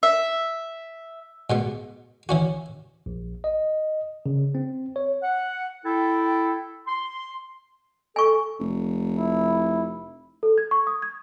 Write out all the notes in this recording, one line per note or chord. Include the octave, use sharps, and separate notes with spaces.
E5
G#2 B2 B3
E3 C#4 F#4
A#1
D#5
C#3
C4
C#5
F#5
E4 A4 G5
C6
A4 G#5 C#6
F1
E4
A4
G#6
C#6
D#6
G#6